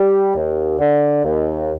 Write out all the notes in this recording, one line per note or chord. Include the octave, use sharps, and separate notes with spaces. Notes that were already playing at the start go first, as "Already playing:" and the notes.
Already playing: G3
D#2
D3
D#2